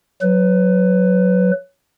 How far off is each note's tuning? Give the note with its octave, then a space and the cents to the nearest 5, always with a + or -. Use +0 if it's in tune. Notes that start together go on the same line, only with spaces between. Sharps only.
F#3 +0 B4 +20